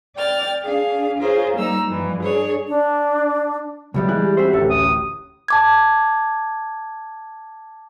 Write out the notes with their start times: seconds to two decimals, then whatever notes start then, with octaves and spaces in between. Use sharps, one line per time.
0.16 D5 G5 F6 A6
0.62 D4 G#4 F5
1.18 F4 G#4 A#4 C5 C#5
1.56 G3 A#3 D#4 A#5 E6
1.88 G2 E3 F3
2.22 D4 G#4 C#5
2.68 D4
3.94 C#2 F#3 G3 B3 G4 E5
4.09 E3 G#3 E4 F#6
4.21 G4
4.37 C4 F#4 C5 E5
4.53 D1 A1 C#4 A4 E5
4.70 D#6
5.48 A5 D6 G#6